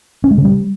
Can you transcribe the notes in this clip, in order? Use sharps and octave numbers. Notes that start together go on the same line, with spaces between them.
C#4
G#3
C#3
G3